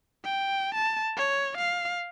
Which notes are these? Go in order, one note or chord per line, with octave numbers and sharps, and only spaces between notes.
G5
A5
C#5
F5